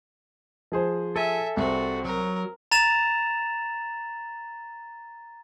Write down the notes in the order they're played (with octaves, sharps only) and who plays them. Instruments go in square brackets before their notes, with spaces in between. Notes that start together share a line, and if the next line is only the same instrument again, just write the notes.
[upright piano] F3 G#4 C5
[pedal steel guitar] A4 G#5 [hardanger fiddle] E5
[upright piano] C2 [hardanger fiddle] C4 F#4
[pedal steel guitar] F#3 [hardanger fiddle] A#4
[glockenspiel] A#5 A6 E7 F7